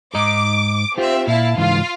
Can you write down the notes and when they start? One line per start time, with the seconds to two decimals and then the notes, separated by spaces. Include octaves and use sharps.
0.15 G#2 D#5 A#5 D6
0.98 C4 F4 G4 E5
1.27 A#2 E4 F5 A5
1.58 C#2 G#2 E3 F4 F5